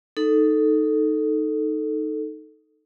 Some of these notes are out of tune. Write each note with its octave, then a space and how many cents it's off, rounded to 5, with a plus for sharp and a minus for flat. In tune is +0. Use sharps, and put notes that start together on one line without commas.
D#4 +0 A4 +0